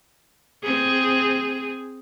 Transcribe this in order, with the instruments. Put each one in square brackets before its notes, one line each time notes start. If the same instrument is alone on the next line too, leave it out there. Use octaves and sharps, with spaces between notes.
[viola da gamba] C4 G#4